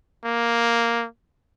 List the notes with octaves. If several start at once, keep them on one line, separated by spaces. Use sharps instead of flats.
A#3